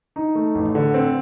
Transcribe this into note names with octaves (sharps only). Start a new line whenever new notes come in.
D#4
A3
A1
D3
C4